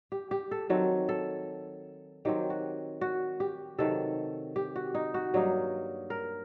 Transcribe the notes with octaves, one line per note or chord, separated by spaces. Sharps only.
G4
G4
A4
D#3 F#3 C4 A4
A4
D#3 F#3 C4 G4
F#4
F#4
G4
C3 D#3 F#3 A4
G4
F#4
D#4
F#4
G2 F#3 A#3 D#4
A#4